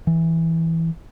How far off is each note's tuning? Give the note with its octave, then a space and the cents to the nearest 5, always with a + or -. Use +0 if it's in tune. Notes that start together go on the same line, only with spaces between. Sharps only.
E3 -5